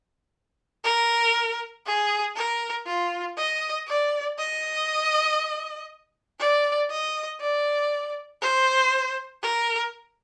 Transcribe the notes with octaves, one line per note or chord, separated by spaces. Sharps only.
A#4
G#4
A#4
F4
D#5
D5
D#5
D5
D#5
D5
C5
A#4